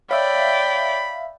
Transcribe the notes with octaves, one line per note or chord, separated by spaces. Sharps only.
C#5 D5 E5 F5 G5 B5 B6